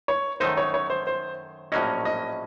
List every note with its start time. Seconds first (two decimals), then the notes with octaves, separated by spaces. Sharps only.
0.08 C#5
0.40 F#2 D#3 A3 D#4 C5
0.57 C#5
0.74 C#5
0.90 C5
1.07 C5
1.72 A#1 A2 F#3 A#3 C#4 D#5
2.05 D#5